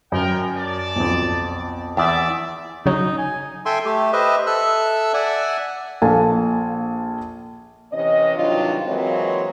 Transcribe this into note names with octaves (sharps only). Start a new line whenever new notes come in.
F#2 B3 A#4 G5
D5 A5
B1 F2
E2 D5 E5
C#3 F#3 D#4
G#5
A4 E5 G5 G#5 C6
A3 G4
G4 B4 C5 D#5 E5
A4 E5 E6 F#6
D5 E5 F#5 G#5
A#1 A4 F5 G#5 A5
C3 E3 C#4 D#5
G2 C3 D#3 F#3 D4 F4
E3 F#3 G#3 A#3 C4 F#4